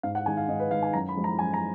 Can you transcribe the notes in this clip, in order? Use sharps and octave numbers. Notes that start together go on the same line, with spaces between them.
G#2 F5
F#5
D#3 G#3 G#5
F5
G#2 D#5
B4
D#3 G#3 F5
G#5
F#2 A#5
B5
F3 G#3
A#5
F#2 G#5
A#5